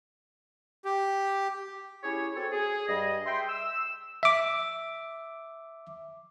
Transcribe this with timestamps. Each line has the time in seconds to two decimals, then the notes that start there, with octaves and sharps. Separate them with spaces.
0.85 G4
2.04 C#4 E4 G4 G#4 C#5
2.35 C4 F#4 A4 C#5
2.52 G#4
2.87 G2 G3 G#4 D#5
3.26 E5 G5 C6
3.49 E6
4.23 E5 D6